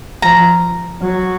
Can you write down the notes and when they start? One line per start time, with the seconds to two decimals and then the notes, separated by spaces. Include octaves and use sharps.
0.22 F3 A#5
1.01 F#3